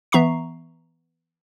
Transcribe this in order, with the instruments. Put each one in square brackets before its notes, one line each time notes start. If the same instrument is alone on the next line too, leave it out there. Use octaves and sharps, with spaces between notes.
[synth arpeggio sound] E3 B3 E5 A#5 C#6 C7